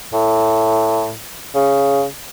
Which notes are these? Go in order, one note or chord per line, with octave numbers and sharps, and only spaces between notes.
A2
C#3